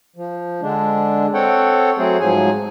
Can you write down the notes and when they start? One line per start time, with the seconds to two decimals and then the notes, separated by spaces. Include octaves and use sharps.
0.16 F3
0.62 D3 G#3 D4
1.34 C4 A4 C#5 F#5 G5
1.98 F#3 A3 C4 G#4 C5
2.20 G#2 F3 F#3 G#4 G#5